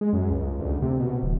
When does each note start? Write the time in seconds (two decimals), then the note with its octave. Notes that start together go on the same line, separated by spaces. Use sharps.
0.01 G#3
0.13 F#2
0.31 C#2
0.60 D2
0.82 C3
1.00 B2
1.23 D1